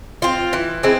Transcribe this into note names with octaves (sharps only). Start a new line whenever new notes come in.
C4 F4
E3
G#3 C4 E4